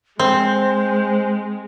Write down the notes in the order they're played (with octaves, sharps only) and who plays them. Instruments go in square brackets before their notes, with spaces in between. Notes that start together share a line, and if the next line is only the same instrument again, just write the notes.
[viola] G#3 [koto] C4 [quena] C5